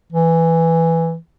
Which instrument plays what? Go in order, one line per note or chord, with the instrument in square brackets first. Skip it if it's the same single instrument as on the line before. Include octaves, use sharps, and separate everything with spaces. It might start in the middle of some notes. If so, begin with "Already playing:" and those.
[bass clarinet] E3